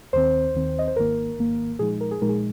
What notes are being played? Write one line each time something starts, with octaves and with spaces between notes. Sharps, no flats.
D#2 D#3 C4 C5
D#2 D#3 C4
D#5
C5
G#1 G#2 D#3 A#3 A#4
G#1 G#2 D#3 A#3
A#2 F3 G#3 D#4 G#4
A#4
G#4
A#2 F3 G#3 D#4 A#4
G#4